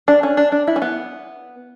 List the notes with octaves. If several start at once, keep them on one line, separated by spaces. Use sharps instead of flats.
D4
C#4
D4
D4
E4
C#4
B3